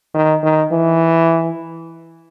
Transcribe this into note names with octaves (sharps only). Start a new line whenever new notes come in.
D#3
D#3
E3